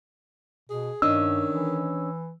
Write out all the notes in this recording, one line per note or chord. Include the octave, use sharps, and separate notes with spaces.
B2 G#4
G2 D#3 C#4 D4 D#5 E6
E3